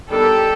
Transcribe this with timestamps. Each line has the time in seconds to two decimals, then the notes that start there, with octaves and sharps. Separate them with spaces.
0.10 D#3 G3 B3 D4 G4 A4